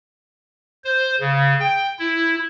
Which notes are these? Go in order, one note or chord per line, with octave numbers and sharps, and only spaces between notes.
C5
C#3
G5
E4